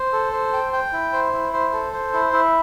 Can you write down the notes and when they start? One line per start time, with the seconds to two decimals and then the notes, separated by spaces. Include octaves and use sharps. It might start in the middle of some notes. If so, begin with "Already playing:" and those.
Already playing: C5
0.13 A4
0.33 C5
0.53 G5
0.73 G5
0.93 E4
1.13 C5
1.33 E4
1.53 C5
1.73 A4
1.93 C5
2.13 E4
2.33 E4